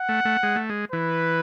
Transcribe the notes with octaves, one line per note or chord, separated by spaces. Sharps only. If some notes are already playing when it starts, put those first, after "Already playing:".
Already playing: F#5
A3
A3
G#3
A3
G#3
E3 B4